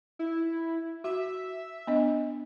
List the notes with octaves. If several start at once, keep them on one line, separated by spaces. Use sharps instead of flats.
E4
F#4 E5
B3 D4 D#5